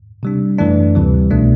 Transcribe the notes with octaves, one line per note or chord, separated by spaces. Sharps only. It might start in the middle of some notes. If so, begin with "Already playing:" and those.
C3 G3 D4
F#2 E3 A3 D4
D2 C3 E3 G3
C2 B2 A3 D4